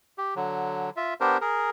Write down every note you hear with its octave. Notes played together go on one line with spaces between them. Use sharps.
G4
D3 F#3
F4 E5
B3 D4 G4 A#4 C5
G#4 A#4